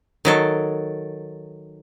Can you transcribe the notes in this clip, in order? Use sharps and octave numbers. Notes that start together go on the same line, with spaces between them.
D#3 F#3 A4